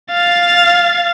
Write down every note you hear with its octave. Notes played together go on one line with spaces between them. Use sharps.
F5 A6